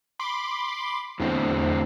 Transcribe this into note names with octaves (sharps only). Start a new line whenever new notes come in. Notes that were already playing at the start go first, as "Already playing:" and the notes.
B5 C6 D6
E2 A2 D3 C4